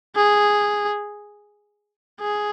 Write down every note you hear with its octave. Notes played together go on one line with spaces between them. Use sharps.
G#4
G#4